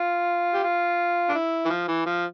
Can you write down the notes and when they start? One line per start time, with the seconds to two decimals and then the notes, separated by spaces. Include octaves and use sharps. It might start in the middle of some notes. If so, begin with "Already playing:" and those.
Already playing: F4
0.54 G4
0.63 F4
1.29 D4
1.35 E4
1.65 E3
1.70 F3
1.88 E3
2.06 F3